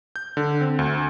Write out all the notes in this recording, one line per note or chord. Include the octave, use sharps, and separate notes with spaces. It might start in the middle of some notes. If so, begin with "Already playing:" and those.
G6
D3
C4
D2